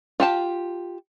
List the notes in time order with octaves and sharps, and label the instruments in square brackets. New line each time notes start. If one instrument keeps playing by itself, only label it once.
[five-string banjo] F4 G4 A5